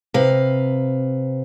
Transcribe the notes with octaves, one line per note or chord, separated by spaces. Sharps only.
C3 B4 F5